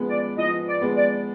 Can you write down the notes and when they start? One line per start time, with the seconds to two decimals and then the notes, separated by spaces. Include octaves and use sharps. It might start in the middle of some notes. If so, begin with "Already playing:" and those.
Already playing: F3 G#3 B3
0.09 D5
0.38 F3 D#5
0.68 D5
0.81 G#3 B3
0.96 D5